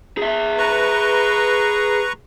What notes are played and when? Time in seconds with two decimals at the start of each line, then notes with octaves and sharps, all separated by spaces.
0.17 G#4 E5
0.58 B4 A#5 C#6